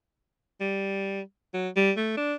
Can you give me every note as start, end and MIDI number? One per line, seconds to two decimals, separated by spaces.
0.61 1.21 55
1.54 1.69 54
1.76 1.91 55
1.97 2.13 57
2.17 2.34 62